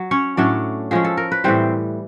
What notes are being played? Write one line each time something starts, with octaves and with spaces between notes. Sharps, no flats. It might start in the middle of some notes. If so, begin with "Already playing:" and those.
Already playing: F#3
C#4 C#5
A2 F#3 A3 C#4 D4 D5
F3 G#3 C#4 G#4
A4
A#4
B4
A2 E3 G3 C4 C5